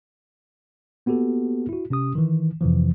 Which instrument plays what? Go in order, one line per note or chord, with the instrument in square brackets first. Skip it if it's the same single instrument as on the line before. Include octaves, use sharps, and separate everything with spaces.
[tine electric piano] A#3 B3 F#4 G4 A4
E4 F#4
C3 C#4 G4 D#6
D#3 E3
F2 C3 E3 F3